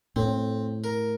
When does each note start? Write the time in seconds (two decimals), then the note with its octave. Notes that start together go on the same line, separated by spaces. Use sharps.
0.16 A2 C4
0.84 A#4